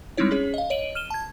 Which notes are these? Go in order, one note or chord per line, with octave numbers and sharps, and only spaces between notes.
G3 G#3 C4 D#4 E4 C#5
C#4 G#4 C#5
D#5 F5
C#5 D#5 D7 D#7 F#7
F6 D#7 E7 G7
A5 G#6